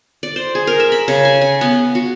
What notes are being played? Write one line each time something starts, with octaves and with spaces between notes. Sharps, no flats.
D5
C5
G#4
A#4
E5
B5
C#3
G#5
G#5
B3
F#4